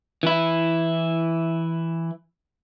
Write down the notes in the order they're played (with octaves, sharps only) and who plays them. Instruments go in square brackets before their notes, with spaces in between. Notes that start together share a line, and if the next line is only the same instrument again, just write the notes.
[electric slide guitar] E3 E4